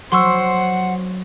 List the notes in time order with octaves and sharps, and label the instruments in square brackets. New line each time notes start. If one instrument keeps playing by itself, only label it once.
[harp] F#3 [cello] C5 [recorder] F#5 [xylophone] C6 C#6 E6